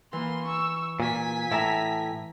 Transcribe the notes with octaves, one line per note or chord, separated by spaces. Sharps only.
E3 A#3 C6
C#6 E6
A#2 G#5 B6
A2 E5 A5 A#5